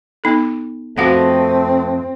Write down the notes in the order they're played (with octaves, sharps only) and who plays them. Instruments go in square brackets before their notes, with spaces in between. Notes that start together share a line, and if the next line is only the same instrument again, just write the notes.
[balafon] B3 D#4 A4
[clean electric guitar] F2 B4 D#5 [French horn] A3 [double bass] C4 [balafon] F#4 F5 F#5